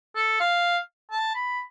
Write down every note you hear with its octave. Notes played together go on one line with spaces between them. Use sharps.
A4
F5
A5
B5